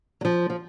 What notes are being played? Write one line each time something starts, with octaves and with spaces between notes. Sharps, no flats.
F#3
F3
F3